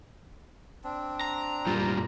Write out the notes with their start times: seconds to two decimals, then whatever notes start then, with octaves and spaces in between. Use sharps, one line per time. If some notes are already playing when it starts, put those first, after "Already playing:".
0.84 C4 D4
1.21 A#5
1.67 F#2 A#2 G3 F4